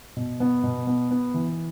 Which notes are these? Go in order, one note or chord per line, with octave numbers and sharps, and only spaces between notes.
B2
B3
B2
B3
B3
E3